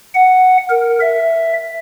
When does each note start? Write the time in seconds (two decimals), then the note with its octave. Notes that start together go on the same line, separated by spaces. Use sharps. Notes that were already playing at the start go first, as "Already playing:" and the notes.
0.15 F#5
0.70 A#4
1.01 E5